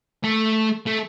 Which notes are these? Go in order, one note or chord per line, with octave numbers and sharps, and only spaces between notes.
A3
A3